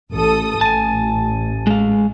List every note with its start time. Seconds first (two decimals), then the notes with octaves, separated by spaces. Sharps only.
0.12 A1 A4 D#6
0.61 A1 G#5 A5
1.67 G#3 F5